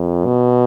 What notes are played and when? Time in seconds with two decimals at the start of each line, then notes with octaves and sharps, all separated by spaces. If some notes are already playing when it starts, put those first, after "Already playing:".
Already playing: F2
0.25 B2